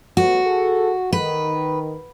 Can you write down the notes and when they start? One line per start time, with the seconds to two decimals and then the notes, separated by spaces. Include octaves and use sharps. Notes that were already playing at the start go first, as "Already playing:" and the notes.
0.17 F#3 A3 B3 F#4
0.45 G#4 A4
1.13 D#3 B4